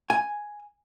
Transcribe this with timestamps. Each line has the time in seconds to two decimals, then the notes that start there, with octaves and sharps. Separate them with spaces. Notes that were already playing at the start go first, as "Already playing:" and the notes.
0.10 G#5